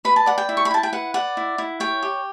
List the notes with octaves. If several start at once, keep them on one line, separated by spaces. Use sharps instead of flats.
B4 B5
A5
D5 F#5
G5
E4
C#6
B5
E4 A5
G5
B4 F#5
D5 F#5
E4
E4
C#5 G5
G4